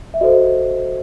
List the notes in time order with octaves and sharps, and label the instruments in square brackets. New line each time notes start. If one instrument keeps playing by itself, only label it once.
[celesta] E5
F#4 A4 C5 D#5